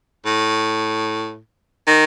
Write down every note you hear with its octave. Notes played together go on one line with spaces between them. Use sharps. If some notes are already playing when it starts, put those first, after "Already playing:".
A2
D#3